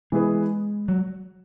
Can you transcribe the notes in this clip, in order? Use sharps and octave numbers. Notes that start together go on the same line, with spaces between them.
E3 G#3 B3 G#4 B4
F#3